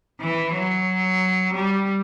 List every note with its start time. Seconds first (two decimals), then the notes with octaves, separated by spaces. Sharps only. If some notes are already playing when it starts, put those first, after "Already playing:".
0.21 E3
0.54 F#3
1.54 G3